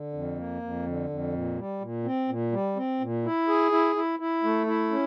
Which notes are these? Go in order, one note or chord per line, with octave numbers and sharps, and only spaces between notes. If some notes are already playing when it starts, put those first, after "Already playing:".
Already playing: D3
F2
A#3
F2
D3
F2
A#2
G3
A#2
C4
A#2
G3
C4
A#2
E4
G#4
E4
E4
E4
A3
E4
C#4